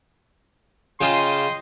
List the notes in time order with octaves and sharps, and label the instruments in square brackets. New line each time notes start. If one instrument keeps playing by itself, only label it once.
[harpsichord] C#3 F4 [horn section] D#5 G5 C6